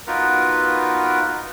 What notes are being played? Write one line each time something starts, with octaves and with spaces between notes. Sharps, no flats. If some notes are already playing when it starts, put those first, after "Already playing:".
B3 D#4 F4 F#4 A#4 B4